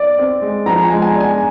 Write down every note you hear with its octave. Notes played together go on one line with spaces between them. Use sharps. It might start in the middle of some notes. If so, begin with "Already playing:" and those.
Already playing: D5
C4
G#3
F3 A#5
G#5
G#3
G#5
D4
G#5